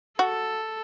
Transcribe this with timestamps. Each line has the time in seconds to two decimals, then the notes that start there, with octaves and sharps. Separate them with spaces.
0.19 F#4 A4